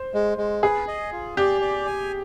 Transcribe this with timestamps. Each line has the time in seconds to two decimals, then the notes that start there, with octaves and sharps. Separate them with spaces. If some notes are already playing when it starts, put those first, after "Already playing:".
Already playing: C5
0.14 G#3
0.38 G#3
0.63 G#4 B4
0.88 D#5
1.12 F4
1.37 G4 D5
1.61 D5
1.86 G#5